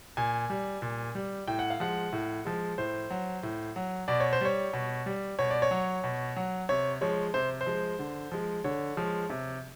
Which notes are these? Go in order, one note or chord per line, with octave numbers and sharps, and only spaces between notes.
A#2 G#5
G3
A#2
G3
A2 G5
F#5
F5
F3 G#3 F#5
A2
F3 G#3
A2 C5
F#3
A2
F#3
B2 D5
C#5
C5
G3 C#5
B2
G3
B2 C#5
D5
C#5
F#3
B2
F#3
C3 C#5
F3 G#3 C#5
C3 C5
C5
F3 G#3
D3
F3 G#3
D3 C#5
F3 G#3
C3